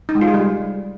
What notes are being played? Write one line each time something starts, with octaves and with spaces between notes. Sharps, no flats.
D#4
G#3
F4
G#4
G3